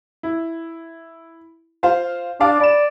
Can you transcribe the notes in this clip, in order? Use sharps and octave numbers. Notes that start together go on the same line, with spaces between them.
E4
F4 C5 F5
D4 D5 F5 D6
D5 B5 E7